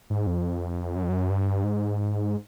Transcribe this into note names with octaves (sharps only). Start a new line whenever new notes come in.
G#2
F2
F#2
F2
F#2
G2
G#2